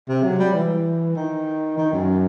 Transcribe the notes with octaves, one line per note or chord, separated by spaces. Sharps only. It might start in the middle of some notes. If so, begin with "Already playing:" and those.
C3
F#3
G3
E3
D#3
D#3
F#2